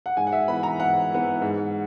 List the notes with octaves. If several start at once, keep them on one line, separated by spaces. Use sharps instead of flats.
F#5
G#2 G#5
F#5
E5
E3 B3 B5
A#5
G#2 F#5
E3 B3
G#2